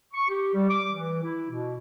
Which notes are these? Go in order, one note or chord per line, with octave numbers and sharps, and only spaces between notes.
C#6
G4
G3
D6
E3
E4
B2